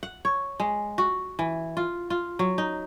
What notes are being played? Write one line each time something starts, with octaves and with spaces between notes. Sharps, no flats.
F#5
C#5
G#3
F#4
E3
F4
F4
F#3
D#4